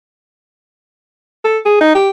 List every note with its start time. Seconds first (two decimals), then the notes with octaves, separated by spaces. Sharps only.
1.45 A4
1.65 G#4
1.81 D#4
1.95 G4